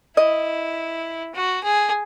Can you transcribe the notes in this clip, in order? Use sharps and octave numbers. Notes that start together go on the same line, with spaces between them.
E4 D#5
F#4
G#4